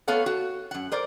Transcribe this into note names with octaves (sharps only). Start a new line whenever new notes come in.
A3 B3 A4 C#5 F5 F#5
F#4
F#2 F#5
A#4 C5 D5